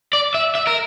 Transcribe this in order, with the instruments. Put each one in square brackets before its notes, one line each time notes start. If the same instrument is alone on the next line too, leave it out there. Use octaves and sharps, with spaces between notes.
[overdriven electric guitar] D5
E5
E5
A#4